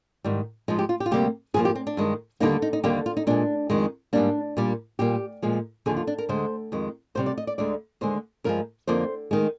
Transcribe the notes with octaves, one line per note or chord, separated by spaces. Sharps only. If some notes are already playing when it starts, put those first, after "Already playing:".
G#2 D#3 G3
G#2 F3 G#3 D#4
G4
F4
G4
F4
D2 C3 G3 A#3 G4
G2 F3 A#3 G#4
G4
C4
D4
G2 D#3 G#3
D#2 D3 G3 A#3 D#4
D#4
D#4
D#2 D3 G3 A#3 G4
F4
D#4
A#2 G#3 D4
F2 D#3 G#3
G#2 G3 A#3 D4
A#2 G3 A#3
A#2 G3 A#3 G4
A#2 F3 G#3
D#2 D3 F3 G#4
F4
D4
A#4
D2 D3 G#3 C5
F2 D#3 G#3
D2 C3 G3 C5
D5
D#5
D5
D2 D3 G#3 D5
D#2 D3 G#3 C5
G2 F3 G#3 A#4
F2 D3 F3 A#3 C5
D#3 G#3